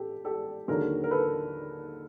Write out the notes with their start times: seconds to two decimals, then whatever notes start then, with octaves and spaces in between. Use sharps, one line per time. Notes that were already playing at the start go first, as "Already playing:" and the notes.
Already playing: G4 A4
0.25 G4 A4
0.68 D#2 D3 F#3 G#4 A#4
1.04 A#4
1.11 A4 B4